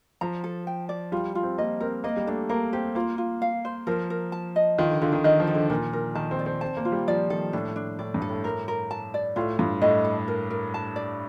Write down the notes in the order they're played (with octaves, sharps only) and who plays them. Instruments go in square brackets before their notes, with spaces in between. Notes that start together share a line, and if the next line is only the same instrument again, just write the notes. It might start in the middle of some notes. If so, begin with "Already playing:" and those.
[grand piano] F3 [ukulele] A#5
[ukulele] A4
G5
D5
[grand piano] G3 [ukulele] F4
[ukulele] F4
[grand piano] C4
[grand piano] A#3 [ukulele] D#5
[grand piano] C4 [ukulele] A#4
[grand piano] A#3 [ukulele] D#5
[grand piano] G3
[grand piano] A3 [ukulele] D4
[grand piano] A#3 [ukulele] A#4
[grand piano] C4 [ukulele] G4
[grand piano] A#3 [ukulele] F4
[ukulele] F4
F5
C5
[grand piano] F3 [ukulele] A#4
[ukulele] A#4
A5
D#5
[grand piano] D#3 [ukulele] F4
[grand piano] D3
[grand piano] D3 [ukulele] F4
[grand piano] D#3
[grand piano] D#3 [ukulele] D#5
[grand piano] F3
[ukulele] A4
[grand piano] D3
[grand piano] A#2 [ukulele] A#4
[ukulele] A#4
[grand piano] D#3 [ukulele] A5
[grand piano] C4
[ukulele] D5
[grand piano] C4
[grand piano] C4 [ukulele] A5
[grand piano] A#3
[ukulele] F4
[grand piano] G3
[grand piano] F3 [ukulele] D5
[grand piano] D#3 [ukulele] A4
[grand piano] A2 [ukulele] D4
[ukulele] D4
[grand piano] A2 [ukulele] D5
[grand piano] G2
[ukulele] A4
[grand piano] A2
[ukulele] A#4
A#4
A5
D5
[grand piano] A2 [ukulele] F4
[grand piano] G2 [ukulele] F4
[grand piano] A2 [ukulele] D#5
[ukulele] A4
A#4
A#4
A5
D5